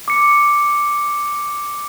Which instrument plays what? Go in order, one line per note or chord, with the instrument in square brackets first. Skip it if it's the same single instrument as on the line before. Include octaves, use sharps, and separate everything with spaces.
[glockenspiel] D6 C#7